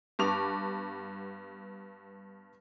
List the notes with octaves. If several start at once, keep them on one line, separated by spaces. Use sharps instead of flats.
G2 B3 C#6 D6 F7